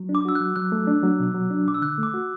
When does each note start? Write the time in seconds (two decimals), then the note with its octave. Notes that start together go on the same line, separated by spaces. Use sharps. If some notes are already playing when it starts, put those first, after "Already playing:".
Already playing: F#3
0.09 D4
0.15 D6
0.25 F#4 E6
0.35 F#3 F#6
0.56 F#3 F#6
0.72 A3
0.87 D4
1.03 F#3
1.20 B2
1.35 F#3
1.51 D4
1.67 B2 D6
1.74 E6
1.82 D3 F#6
1.98 A3
2.03 D6
2.14 F#4